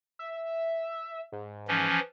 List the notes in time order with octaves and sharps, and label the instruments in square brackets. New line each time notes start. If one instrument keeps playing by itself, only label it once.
[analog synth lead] E5
G#2
[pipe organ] E3 F3 C#4